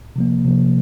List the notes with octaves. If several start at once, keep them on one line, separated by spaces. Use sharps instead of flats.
C3 F3 A#3
C3 F3 A#3